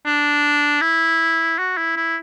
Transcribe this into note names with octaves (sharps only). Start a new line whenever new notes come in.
D4
E4
F#4
E4
E4